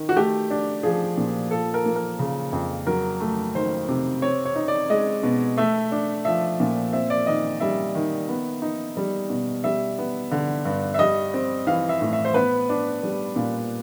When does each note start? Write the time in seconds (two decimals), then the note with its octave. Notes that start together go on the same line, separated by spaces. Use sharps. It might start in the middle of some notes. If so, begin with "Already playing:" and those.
Already playing: D#3
0.09 F#4
0.16 A3 G4
0.50 D4
0.83 F3 G#4
1.18 A#2
1.51 F3 A4
1.74 A#4
1.86 A#3
1.96 A#4
2.19 C#3
2.53 F2
2.87 F#3 A#4
3.20 A3
3.55 D#3 C5
3.88 C3
4.22 C4 C#5
4.46 C#5
4.56 D#4
4.68 D5
4.90 G#3 D#5
5.23 B2
5.57 A3 E5
5.92 D4
6.25 F3 E5
6.60 A#2
6.93 C4 E5
7.10 D5
7.27 D#3 D#5
7.60 G3 E5
7.95 D#3
8.29 B3
8.62 D#4
8.97 G3
9.30 B2
9.64 G3 E5
9.99 B3
10.32 D3
10.65 G2
10.94 E5
10.99 G3 D#5
11.34 C4
11.67 E3 F5
11.89 E5
12.01 A2
12.13 E5
12.25 C5
12.34 B3 B4
12.69 D4
13.03 G3
13.36 A#2